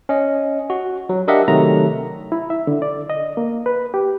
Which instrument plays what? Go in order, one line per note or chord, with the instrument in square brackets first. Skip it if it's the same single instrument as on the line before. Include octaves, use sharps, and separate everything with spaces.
[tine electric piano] C#4 D#5
F#4
F#3
D4 G4 A#4 D#5 E5 F#5
C3 D#3 F#3 A3 A#5
[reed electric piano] E4
E5
D3
D5
D#5
A#3
B4
G4